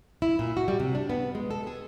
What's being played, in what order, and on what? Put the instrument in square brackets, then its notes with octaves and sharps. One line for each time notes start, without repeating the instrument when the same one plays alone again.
[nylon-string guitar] E4
A#2
F#4
G3
C3
D4
B3
G#3
A4
G#4